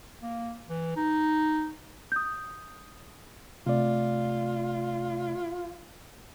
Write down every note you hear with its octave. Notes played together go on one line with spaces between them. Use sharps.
A#3
E3
D#4
D#6 G6
C3 A3 F4 D5